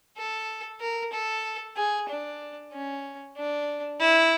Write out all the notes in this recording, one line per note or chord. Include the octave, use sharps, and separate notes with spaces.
A4
A#4
A4
G#4
D4
C#4
D4
E4